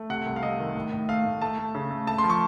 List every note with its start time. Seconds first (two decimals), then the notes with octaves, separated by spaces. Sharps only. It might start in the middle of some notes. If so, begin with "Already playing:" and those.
Already playing: A3
0.10 C3 F#5
0.26 C2
0.36 F5
0.43 C3 D#5
0.59 D#3
0.75 A2
0.92 A2
1.09 A3 F5
1.25 A2
1.42 A3 A5
1.58 A3
1.75 C#3
1.91 A3
2.07 A3 A5
2.18 C6
2.24 F3
2.30 C#6